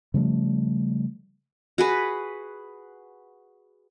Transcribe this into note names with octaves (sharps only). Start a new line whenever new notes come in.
C#3 F3 G3 A3
F#4 G#4 B4